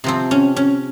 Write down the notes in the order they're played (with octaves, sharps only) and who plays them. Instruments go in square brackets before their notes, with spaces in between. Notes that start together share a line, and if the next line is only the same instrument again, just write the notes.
[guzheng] C3 F3 C4
C#4
C#4